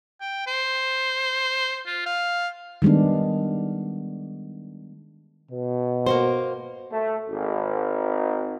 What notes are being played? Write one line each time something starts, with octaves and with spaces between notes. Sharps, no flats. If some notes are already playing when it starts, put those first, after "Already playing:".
G5
C5
F4
F5
D#3 G3 G#3 B3 D4
B2
A#3 F#4 C5
A3
G#1